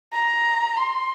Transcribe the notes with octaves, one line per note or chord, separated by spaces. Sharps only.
A#5
C6